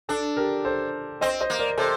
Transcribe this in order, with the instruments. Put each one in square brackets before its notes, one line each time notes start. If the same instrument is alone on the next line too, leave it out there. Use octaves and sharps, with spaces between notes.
[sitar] D4 [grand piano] A4
[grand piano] G4 A#4
A4 C5
[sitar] C4 [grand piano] C5 D#5
[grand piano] C5 D#5
[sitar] A#3
[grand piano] A#4 D5
[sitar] C3 [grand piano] A4 C5